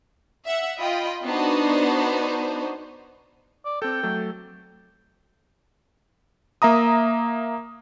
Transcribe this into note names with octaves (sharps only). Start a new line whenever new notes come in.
E5 F#5
F4 D#5 G5 B5
B3 D4 D#4 F#4 C5
D5
C4 A4 G5
F#3 A3 A4
A#3 E5 A#5 D#6